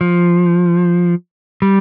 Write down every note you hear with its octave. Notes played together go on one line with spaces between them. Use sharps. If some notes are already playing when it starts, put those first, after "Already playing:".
F3
G3